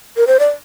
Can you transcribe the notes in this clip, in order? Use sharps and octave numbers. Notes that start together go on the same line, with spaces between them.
A#4
C5
D5